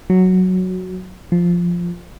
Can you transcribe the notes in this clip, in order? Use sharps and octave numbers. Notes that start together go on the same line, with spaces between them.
F#3
F3